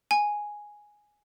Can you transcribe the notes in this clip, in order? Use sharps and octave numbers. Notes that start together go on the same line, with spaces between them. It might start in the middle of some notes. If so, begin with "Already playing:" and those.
G#5